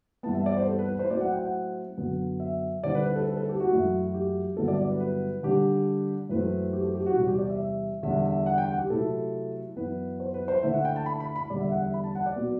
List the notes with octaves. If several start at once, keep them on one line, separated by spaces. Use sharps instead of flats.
G2 E3 B3 A5
E5
D5
C5
A4
B4
B4
C5
A2 F#3 C4 E4 D5
F#5
G5
F#5
F#2 D3 F#3 B3
E5
D3 G3 C4 E4 D5
B4
B4
A4
B4
A4
G4
F#4
F#2 E3 A3 E4
G4
G2 D3 F#3 B3 E4 A4
D5
D5
B4
B4
D3 G3 D4 G4
F#2 E3 A3 C4 E4 B4
G4
A4
G4
F#4
E2 C3 G3 F#4
G4
D5
E5
E5
E2 D3 G3 D4 E5
E5
F#5
G5
F#5
G4
C3 F#3 A3 E4 A4
F#2 E3 B3 E4 B4
C5
B4
C5
D3 A3 E4 E5
F#5
G5
A5
B5
B5
B5
E2 D3 G3 D5
E5
F#5
E5
B5
A5
F#5
D5
B2 F#3 B3